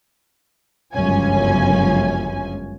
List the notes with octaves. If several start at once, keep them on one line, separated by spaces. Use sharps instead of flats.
G1 C#2 F#2 F3 C#4 G#5